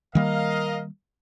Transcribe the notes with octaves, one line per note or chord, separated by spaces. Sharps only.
D#3 G3 A#3 A#4 D#5 F5